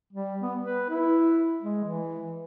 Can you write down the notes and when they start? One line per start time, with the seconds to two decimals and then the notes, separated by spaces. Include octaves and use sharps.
0.13 G3
0.42 B3
0.62 B4
0.90 E4
1.62 G#3
1.84 E3